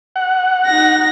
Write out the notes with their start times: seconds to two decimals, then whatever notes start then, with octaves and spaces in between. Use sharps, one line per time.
0.16 F#5
0.67 D#4 A#6